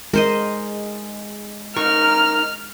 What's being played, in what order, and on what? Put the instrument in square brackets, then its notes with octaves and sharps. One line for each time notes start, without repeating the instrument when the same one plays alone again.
[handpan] G#3 [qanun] A#4 C5 D#5
[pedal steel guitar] D#4 A#4 [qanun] C#6 [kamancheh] F6